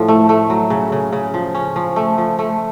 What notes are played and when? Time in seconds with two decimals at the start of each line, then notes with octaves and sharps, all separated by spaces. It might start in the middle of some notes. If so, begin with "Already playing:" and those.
Already playing: A2 F3
0.08 A3
0.29 A3
0.50 F#3
0.70 C#3
0.92 C#3
1.13 C#3
1.34 F3
1.55 C#4
1.76 F3
1.96 A3
2.18 F3
2.39 A3